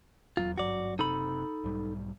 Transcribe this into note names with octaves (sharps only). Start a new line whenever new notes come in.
D#1 E2 F#3 F4
G#1 G2 F#3 F#4 D5
F#1 C3 D#4 A4 B5
B1 G#2 G3